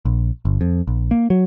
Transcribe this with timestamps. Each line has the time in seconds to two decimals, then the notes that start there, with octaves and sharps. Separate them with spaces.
0.05 A#1
0.45 G1
0.61 F2
0.87 A#1
1.11 A#3
1.30 F#3